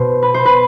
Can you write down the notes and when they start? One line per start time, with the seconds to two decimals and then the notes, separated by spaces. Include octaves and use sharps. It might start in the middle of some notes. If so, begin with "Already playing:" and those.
Already playing: B2 C5
0.22 B4
0.34 C5
0.45 B4